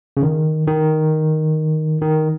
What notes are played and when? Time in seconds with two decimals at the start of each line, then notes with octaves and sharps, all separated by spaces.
0.17 C#3
0.22 D#3
0.68 D#3
2.02 D#3